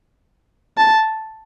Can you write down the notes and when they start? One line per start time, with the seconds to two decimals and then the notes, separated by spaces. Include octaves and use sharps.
0.78 A5